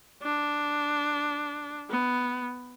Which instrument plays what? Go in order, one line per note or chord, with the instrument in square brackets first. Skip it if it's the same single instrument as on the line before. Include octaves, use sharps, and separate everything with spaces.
[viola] D4
B3